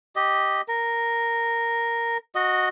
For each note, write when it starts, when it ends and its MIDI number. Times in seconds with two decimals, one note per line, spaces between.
0.16 0.61 67
0.16 0.61 75
0.68 2.18 70
2.35 2.69 66
2.35 2.69 75